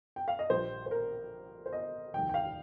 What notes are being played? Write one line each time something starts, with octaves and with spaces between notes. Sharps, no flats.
G5
F5
D#5
A#1 A#2 G3 C5
C5
A#4
C5
D#5
F1 D#2 D#3 G3 G5
G5
F5